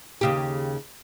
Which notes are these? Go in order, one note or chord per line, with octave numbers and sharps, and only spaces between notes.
D#2 C#3 G4